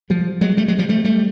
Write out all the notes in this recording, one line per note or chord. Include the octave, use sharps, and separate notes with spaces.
F3 G3
F#3 G#3
G3 A3
F#3 G#3
F3 G3
G3 A3
G3 A3